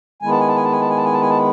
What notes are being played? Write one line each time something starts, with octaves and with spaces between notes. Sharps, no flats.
D#3 G#3 B3 E4 G#5
A5
G#5
A5
G#5
A5
G#5
A5
G#5
A5
G#5
A5
G#5
A5